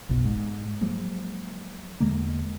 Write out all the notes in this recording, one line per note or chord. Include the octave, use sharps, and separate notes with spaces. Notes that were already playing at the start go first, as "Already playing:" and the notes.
F#1 B1 B2
G#2
F3 F#3 G#3 A#3
E2 D3 G#3 A#3